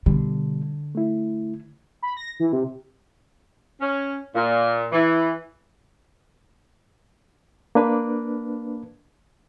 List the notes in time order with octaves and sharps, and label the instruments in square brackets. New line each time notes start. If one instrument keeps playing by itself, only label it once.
[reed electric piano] B2 G3 [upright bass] D3
[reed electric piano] A3 E4
[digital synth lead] B5
A#6
E3
C3
[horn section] C#4
A#2
E3
[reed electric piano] A#3 D4 B4